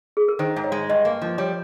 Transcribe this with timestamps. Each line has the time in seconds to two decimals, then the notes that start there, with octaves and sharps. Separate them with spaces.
0.17 G#4
0.28 A#4
0.39 D#3 C5
0.56 G#2
0.64 C#5
0.72 G#3
0.89 G2 D#5
1.05 A#3
1.22 F3
1.38 G3 C#5